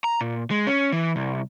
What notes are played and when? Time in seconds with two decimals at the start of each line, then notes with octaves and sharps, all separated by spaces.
0.04 A#5
0.21 A#2
0.51 G#3
0.67 C#4
0.92 E3
1.16 C2